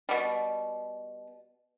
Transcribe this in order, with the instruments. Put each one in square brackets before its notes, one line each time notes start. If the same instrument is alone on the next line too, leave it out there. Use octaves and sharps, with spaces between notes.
[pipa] B2 G3